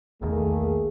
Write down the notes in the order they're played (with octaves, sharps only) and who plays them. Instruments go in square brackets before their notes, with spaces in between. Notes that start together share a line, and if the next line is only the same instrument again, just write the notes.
[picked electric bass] B1 E2 D#3 [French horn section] A3 A#3 G#4